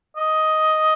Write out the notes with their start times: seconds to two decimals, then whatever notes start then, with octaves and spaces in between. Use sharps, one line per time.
0.17 D#5